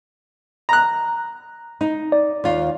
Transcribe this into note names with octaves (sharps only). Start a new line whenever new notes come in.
A#5 F#6
D#4
D5
D#2 F4